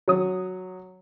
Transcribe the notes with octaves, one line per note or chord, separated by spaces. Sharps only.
F#3 C#5 D#6